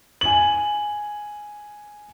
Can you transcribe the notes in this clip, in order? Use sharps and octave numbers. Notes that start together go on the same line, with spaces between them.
G#5 F#7